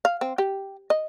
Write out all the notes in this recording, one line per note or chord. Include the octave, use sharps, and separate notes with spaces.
F5
C4
G4
D#5